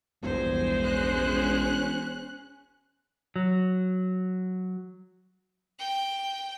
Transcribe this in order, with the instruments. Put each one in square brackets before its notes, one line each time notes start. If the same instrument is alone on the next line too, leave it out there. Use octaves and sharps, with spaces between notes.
[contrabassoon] E1 [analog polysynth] A#1 E2 G2 [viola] G#3 C5
[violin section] C#4 F#6
[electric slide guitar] F#3
[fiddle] G5